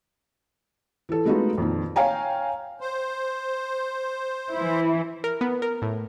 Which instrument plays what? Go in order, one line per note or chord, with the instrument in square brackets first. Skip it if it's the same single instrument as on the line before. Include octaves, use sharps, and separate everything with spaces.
[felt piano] E3 A4
G#3 A3 B3 D#4 F4 F#4
F2 A#2 D#3
C#5 F5 G5 G#5 A#5
[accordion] C5
[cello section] E3 E4
[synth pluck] A#4
B3
A#4
A2